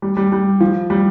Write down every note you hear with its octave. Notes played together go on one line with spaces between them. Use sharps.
G3
G3
G3
F3
G3